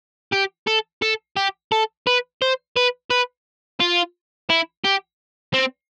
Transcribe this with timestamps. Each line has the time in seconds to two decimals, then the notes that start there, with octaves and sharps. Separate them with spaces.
0.33 G4
0.67 A4
1.02 A4
1.37 G4
1.72 A4
2.07 B4
2.42 C5
2.76 B4
3.11 B4
3.80 F4
4.50 E4
4.84 G4
5.54 C4